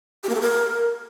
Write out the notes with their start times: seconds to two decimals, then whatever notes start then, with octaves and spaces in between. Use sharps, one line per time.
0.23 G4
0.29 A#3
0.35 A4
0.41 A#4